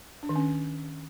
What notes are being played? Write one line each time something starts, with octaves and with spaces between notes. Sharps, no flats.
D4
D#3
C#4